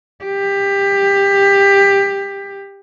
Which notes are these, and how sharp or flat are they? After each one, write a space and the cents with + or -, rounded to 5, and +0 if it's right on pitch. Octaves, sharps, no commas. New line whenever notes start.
G4 +20